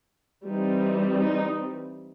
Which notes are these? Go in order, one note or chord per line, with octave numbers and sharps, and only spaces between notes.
E3 G3 C4 D#4
D#4